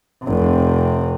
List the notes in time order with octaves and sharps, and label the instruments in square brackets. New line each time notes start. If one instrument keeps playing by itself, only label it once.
[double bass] F1 C3